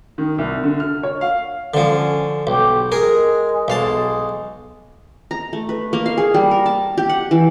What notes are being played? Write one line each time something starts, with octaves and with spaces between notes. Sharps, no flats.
D#3
C2
D3
F6
C#5
F5
D3 F3 C#4
B1 G4
G#3 G#4 A#4
B1 G#3 F5 A5
A#5
A3
B4
A#3
F5
G#4
G3
A#4
A5
G4
F#5
E3